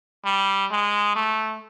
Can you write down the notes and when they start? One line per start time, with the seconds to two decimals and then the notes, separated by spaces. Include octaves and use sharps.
0.25 G3
0.71 G#3
1.16 A3